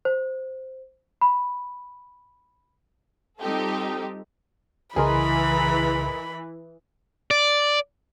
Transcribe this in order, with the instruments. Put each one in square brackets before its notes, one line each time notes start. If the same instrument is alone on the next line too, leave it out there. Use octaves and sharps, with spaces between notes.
[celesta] C5
B5
[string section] G3 C4 D#4 F4 G4 A4
[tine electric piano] C2 C#3 C6 [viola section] E3 [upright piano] G#4 A#4 D#5 [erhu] B5
[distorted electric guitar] D5